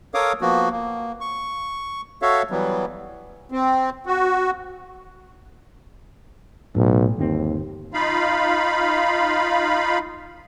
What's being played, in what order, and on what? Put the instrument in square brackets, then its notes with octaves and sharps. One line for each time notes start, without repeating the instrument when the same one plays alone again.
[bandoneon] A4 A#4 C#5 F5 D6 D#6
F3 A#3 B3 F#4
A#3
C#6
F#4 A4 C#5 E5 F5
E3 F#3 G3 B3
[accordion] C4
F#4
[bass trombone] B1 [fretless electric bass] A2
[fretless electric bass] G1 C4 [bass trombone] D#2
[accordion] D#4 F4 F5 B5